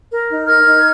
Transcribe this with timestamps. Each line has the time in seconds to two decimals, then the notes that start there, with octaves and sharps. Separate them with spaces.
0.11 A#4
0.29 D#4
0.47 A#4 F6 G#6
0.65 D#4